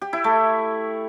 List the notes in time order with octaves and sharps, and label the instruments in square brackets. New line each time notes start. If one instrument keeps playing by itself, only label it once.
[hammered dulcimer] G4
E4
A3